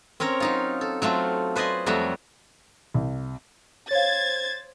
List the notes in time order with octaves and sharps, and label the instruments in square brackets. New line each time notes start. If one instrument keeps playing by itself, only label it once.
[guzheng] C4 C#4 A#4 C#5
F#3 D#4 F4
A4
F#3 A3 C4 F4
B4 C5 D5 D#5 G#5 C6
F2 F#3 G3 A3 F#4
[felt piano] C2
[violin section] C5 G#6 A6 [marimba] C#5 F5